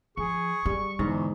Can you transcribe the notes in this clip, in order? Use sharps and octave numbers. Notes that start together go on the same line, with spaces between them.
F3 G#4 C#6
G3
E2 G#2 D3